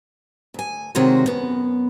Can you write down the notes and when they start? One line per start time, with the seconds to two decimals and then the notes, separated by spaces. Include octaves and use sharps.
0.54 D2 G#5
0.95 C3 D#3 G#3 F#4 C5 C#5
1.26 F#2 B3